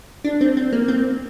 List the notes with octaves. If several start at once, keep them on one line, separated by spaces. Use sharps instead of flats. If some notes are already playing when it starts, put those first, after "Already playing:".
D4
C4
C4
A#3
C4